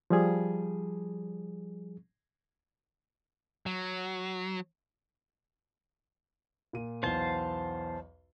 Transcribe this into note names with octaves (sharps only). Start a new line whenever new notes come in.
F3 G3 G#4
F#3
A#2 D#7
B1 E2 C5 F5 A5 G7